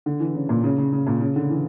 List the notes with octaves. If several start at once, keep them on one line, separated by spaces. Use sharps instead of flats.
D3
E3
C#3
A#2
C#3
C#3
C#3
A#2
C#3
D3
E3